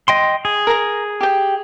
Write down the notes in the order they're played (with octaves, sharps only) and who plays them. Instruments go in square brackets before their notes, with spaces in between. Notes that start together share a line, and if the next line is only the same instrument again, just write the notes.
[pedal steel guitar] D#5 G5 C6
G#4
[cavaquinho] A#4 A#5
G4 G5